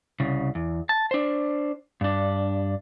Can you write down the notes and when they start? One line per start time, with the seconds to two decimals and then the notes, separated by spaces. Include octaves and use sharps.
0.20 C2 C#3
0.55 E2
0.89 A5
1.11 D4 C5
2.01 G2 D4